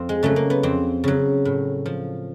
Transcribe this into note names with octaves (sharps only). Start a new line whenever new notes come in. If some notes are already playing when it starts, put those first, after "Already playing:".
Already playing: F2 C4
G#3
C#3 F#3 A3
A#3
B3
F2 C4
C#3 F#3
A2
F3